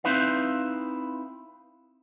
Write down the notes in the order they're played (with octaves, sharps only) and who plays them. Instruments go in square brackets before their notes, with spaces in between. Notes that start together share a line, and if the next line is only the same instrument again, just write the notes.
[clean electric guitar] C4 D#4 E4 B4 F5